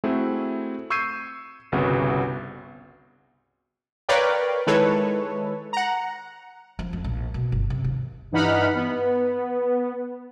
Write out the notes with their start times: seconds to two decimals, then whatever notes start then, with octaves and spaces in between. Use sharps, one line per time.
0.04 A3 C4 E4 F#4 G#4
0.90 C#6 E6 G6 G#6 C7 D#7
1.72 G1 C2 C#3 B3 F#4
4.09 A#4 B4 C#5 D5 F5 G5
4.67 D#3 G#3 E4 A4 B4 C#5
5.73 F#5 A#5
6.79 F3
6.93 F2
7.04 A#1
7.34 B2
7.52 G1
7.70 C3
7.84 D#2
8.31 G2 E3 D#4 F#5 B5 F6
8.75 B3